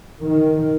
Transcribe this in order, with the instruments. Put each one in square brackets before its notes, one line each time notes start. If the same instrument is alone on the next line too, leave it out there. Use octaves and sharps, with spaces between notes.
[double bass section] D#3